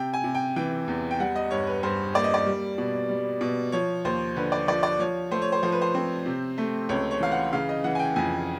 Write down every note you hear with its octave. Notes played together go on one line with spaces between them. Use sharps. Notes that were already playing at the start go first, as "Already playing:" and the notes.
Already playing: C3 G5
G#5
C3
G5
E3 G5
E2
G5
G3 F#5
D#5
G2 C#5
B4
G2 C5
A#3 D5
D#5
D5
G3
B2
G3
B2
F3 C#5
D#2 C5
D3 B4
D5
F3 D5
D5
F3 C#5
A3 C5
C#5
C5
F3 C5
B4
C5
C4
C3
A3
C#2 C#5
C#5
E3 F5
F#5
C#3 F5
D#5
E3 F#5
G#5
G5
F2 G#5